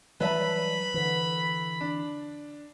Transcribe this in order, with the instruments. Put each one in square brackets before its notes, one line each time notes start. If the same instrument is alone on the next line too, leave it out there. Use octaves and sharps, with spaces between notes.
[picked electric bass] E3 F#3 G3 [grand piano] B4 E5 A5 [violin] B5
[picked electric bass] D3 E3
[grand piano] D4